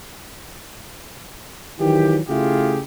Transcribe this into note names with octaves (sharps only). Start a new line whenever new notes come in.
D#3 E3 F#3 G4
C#3 A3 E4 F4 G4 G#4